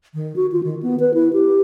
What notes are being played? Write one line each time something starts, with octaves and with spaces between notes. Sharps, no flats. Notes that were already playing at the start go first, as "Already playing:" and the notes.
D#3
F#4
F4
D#3
B3
B4
E4
G4